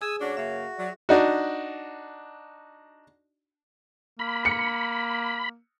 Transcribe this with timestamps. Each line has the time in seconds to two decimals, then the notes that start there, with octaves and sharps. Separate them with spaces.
0.02 G#4 G#5 D#6 E6
0.20 D2 C#4 D4 F#4 C#5
0.37 F#2 C#3 A#3 E5
0.79 F#3 D5
1.09 D4 D#4 F#4
4.19 A#3 B5
4.45 C#7